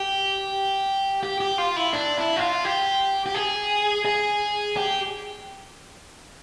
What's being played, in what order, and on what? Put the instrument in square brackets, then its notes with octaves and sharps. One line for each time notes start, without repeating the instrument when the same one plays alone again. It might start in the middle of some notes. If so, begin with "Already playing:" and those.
Already playing: [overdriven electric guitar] G4
G4
G4
F4
E4
D4
E4
F#4
F4
G4
G4
G#4
G#4
G4